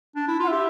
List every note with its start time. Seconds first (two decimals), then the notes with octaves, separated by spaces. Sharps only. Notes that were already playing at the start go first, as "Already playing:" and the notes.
0.16 D4
0.28 E4
0.40 F4 F#5
0.48 G4 E5